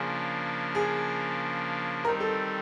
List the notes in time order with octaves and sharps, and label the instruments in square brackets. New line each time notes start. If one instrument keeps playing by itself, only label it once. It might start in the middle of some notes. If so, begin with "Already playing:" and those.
Already playing: [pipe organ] C#3 F3 A#3 D4 [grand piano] G#4
[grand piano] G#4
[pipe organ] D#3 G3 C4 D#4 [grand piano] A#4
[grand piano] A4